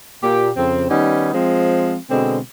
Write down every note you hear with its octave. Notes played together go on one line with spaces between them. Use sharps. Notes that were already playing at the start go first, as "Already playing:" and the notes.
A#2 G4
F2 C#3 C4
D#3 G3 B3 C#4 D#4
F3 G#3 C4
B2 D3 G#3 C4